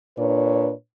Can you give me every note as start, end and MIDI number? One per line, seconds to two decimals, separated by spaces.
0.17 0.71 46
0.17 0.71 62
0.17 0.71 71
0.17 0.71 73